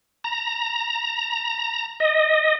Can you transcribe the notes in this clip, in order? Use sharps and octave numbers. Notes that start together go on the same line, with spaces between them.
A#5
D#5